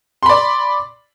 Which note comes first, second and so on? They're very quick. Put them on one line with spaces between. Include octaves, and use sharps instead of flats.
C6 B5 D5